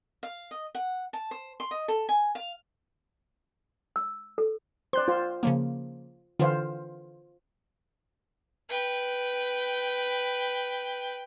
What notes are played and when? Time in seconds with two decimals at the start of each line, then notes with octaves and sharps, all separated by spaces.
0.23 F5
0.51 D#5
0.75 F#5
1.13 A5
1.31 C5
1.60 C6
1.71 D#5
1.88 A4
2.09 G#5
2.35 F5
3.96 E6
4.38 A4
4.93 C5 D5 C6 F#6
5.08 F4 C5
5.43 C#3 F3 A#3
6.39 D3 E3 F4 C5 F5
8.70 B4 G5